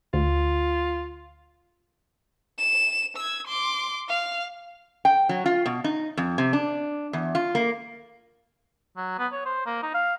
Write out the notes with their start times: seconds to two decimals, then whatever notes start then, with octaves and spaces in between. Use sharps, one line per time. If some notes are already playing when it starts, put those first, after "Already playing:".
0.14 D2 F4
2.58 E7
3.17 E6 G#6
3.47 C6 D6
4.08 F5
5.05 G5
5.29 F#3
5.46 F4
5.66 B2
5.84 D#4
6.17 F2
6.38 C3
6.53 D4
7.13 E2
7.35 F4
7.55 A#3
8.97 F#3
9.19 B3
9.32 C#5
9.45 C5
9.66 A#3
9.83 D#4
9.95 F5